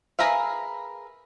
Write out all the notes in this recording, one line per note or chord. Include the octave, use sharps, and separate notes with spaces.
G#4 A#4 B4 E5 F5